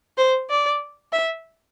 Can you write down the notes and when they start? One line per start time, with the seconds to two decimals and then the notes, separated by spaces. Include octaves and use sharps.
0.18 C5
0.50 D5
1.13 E5